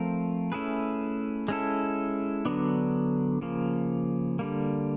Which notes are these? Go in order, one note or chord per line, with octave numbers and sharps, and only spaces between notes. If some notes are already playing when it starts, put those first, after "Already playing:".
Already playing: F3 A3 C4 F4 A#4
A3 C#4 E4 G#4 B4
G#3 C#4 E4 A4
D3 F#3 B3 D4
C#3 F3 A#3
D3 G3 A#3